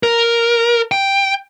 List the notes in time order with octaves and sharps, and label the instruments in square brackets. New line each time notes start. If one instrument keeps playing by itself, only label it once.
[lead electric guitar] A#4
G5